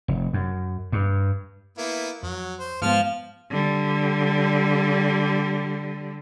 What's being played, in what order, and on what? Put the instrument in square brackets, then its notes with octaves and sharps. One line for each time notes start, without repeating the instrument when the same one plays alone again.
[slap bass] F1
F#2
G2
[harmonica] A#3 B3 E4
[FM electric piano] F2 [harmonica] F#3
[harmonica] C5
[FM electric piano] G#2 G#3 B3 [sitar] F3 [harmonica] F6
[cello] D3 G3